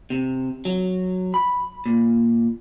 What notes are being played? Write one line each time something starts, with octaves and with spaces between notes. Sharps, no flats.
C3
F#3
B5
A#2